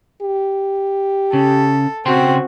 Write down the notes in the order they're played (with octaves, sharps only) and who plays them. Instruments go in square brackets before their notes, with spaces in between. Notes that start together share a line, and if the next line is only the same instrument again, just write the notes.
[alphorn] G4
[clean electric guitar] C#3 [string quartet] A4
[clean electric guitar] C#3 G5 C6 [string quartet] C4 F#4